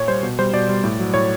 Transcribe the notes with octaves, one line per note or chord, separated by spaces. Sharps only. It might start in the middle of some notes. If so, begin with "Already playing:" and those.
Already playing: A#2 C#5
G3 C5
B2
G3 C5
B2 D5
G3
A2
F#3
A2 C#5